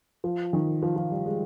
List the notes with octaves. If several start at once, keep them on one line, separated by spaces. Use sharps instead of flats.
F3
D#3
F3
F3
G3
G#3